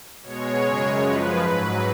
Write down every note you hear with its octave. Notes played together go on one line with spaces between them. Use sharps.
B2 G#3 C#5
F#2 C#3 G#3
F#2 F3 G#3 B4
G#2 F#3